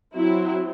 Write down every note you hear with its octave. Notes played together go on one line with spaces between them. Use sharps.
F#3 C4 E4